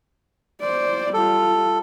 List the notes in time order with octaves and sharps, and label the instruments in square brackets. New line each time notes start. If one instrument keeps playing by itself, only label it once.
[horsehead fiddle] C5 D5
[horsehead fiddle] G3 F4 [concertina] A4